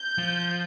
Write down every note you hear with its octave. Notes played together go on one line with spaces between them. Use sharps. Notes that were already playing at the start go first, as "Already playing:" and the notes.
Already playing: G6
F3